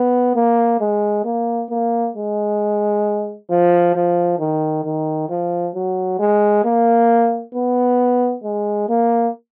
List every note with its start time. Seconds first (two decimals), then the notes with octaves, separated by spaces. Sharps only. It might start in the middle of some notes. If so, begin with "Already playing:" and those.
Already playing: B3
0.36 A#3
0.80 G#3
1.25 A#3
1.70 A#3
2.16 G#3
3.50 F3
3.95 F3
4.39 D#3
4.84 D#3
5.29 F3
5.75 F#3
6.19 G#3
6.65 A#3
7.55 B3
8.44 G#3
8.89 A#3